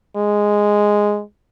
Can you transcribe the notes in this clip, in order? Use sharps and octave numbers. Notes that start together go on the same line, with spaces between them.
G#3